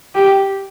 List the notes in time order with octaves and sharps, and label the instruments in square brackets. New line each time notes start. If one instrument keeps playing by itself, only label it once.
[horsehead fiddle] G4